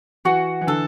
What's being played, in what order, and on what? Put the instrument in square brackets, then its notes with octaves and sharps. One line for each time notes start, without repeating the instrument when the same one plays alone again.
[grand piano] E3 [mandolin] F#4
[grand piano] E3
[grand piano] D3 [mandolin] A4